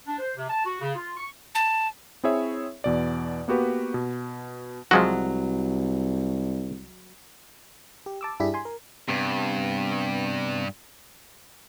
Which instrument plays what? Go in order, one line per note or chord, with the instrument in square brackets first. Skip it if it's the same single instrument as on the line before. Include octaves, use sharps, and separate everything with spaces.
[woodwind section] D4
C5
C3
A5
F#4
C#3
F4
C#6
[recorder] A5
[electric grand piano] C4 E4 G#4 C#5 E5
E2 B2 D5
A#3 B3 F#4 G4 B4
B2
[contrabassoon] C2 [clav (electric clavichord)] F3 G#3 F#4 [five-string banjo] F#3
[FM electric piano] G4
A5 D6 E6
G2 D4 E4 G4 G#4 B6
G#5 C6
A#4
[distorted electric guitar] G2 [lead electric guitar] C3 B3